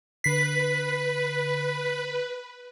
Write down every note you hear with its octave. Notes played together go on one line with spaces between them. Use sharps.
D3 B4 B6 C7